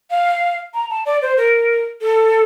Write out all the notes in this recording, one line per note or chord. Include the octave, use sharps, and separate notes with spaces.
F5
A#5
A5
D5
C5
A#4
A4